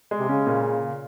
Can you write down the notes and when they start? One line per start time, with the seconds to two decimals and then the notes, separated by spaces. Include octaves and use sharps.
0.11 G#3
0.19 C3
0.29 C#3 C#4
0.47 A#2